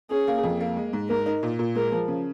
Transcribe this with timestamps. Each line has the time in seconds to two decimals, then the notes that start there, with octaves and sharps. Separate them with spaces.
0.10 C#4 G#4
0.28 A#3
0.44 F2
0.60 A#3
0.77 G#3
0.93 G#2
1.09 G#2 A#4
1.26 D#4
1.43 A#2
1.59 A#2
1.75 G#3 A#4
1.92 F3
2.08 C#3